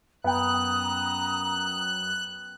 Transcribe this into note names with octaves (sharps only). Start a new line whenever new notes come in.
F#2 B3 G5 A#5 D#6 F#6